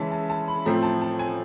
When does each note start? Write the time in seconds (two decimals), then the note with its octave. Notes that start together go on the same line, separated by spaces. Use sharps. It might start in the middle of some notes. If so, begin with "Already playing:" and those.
Already playing: C#3 E3 G#3 C#4 E4 A5
0.12 A5
0.30 A5
0.48 B5
0.65 A2 F3 A3 C4 A#5
0.83 A5
1.02 A5
1.19 G#5